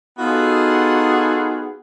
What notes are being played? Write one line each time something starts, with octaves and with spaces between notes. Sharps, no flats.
B3 D#4 F4 F#4 G#4 A4